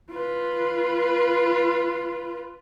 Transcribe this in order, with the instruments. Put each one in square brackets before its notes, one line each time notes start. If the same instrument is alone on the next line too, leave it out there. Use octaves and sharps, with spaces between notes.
[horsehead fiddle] F4 B4